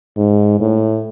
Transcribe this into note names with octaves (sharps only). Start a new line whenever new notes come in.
G#2
A2